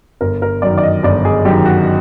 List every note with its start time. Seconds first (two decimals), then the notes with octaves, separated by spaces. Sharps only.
0.21 G1 A#4
0.42 A#4
0.62 F#2 D#3 D5
0.78 D5
0.83 D#5
1.03 G1 D5
1.25 G#4
1.45 F#2 D#3 G4
1.66 F#4